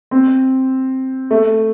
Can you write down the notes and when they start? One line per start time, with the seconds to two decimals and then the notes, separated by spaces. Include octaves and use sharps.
0.11 C4
1.31 A3